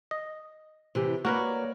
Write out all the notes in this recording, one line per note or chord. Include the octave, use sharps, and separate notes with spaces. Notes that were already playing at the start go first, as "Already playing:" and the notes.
D#5
C3 E3 G4
A#3 F#4 A#4 B4 C#5 D5